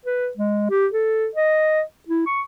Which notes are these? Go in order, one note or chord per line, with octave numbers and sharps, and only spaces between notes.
B4
G#3
G4
A4
D#5
E4
C#6